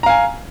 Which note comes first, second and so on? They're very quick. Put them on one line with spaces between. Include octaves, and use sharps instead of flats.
A#5 F5 G#5